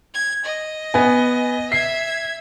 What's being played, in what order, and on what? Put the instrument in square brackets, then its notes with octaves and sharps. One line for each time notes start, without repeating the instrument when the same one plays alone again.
[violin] G#6
D#5
[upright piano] B3 G#5
[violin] E5 G#6 [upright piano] C7